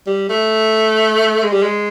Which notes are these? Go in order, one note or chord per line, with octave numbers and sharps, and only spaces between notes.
G3
A3
G#3
G3
G#3